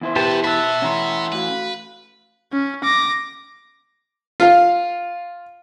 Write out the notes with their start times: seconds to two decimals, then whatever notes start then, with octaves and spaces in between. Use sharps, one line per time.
0.01 E2 E4 C5
0.16 B2 B3 G4 B4 A5
0.44 B3 F#4 E5 A5 B5 F#6 A6
0.82 E3 C#4 F#5 A#5 C6
1.32 A3 F#4 B4 F5
2.53 C#4
2.84 D6 A#6
4.40 F4 F5